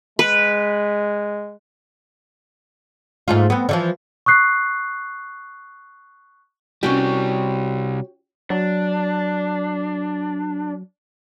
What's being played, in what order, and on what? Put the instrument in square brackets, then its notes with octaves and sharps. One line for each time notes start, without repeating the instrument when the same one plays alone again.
[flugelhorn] G#3 [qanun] B4
[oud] G#2 A3 F4
B3 C4
D3 E3 F3
[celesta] C#6 D#6 F#6 C7
[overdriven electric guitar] C3 G3 [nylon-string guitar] C#4 F#4 G4
[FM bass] F#3 [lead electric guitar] D4